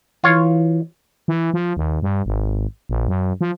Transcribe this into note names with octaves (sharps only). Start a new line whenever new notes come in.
E3 F4 C#5
E3
F3
D#2
G2
G#1
A#1
F#2
F3